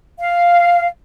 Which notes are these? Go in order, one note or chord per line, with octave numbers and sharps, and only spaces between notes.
F5